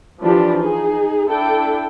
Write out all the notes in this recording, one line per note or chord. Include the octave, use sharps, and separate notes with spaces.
E3 F3 D4 G4
D#4 G#4
D4 E4 A4 G5